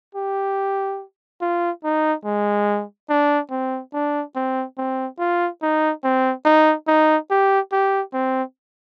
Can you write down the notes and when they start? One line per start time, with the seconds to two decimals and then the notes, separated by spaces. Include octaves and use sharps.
0.15 G4
1.41 F4
1.84 D#4
2.25 G#3
3.10 D4
3.51 C4
3.94 D4
4.36 C4
4.78 C4
5.19 F4
5.62 D#4
6.04 C4
6.45 D#4
6.88 D#4
7.30 G4
7.72 G4
8.14 C4